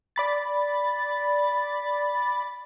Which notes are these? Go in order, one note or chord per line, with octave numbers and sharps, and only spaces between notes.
D5 B5 A6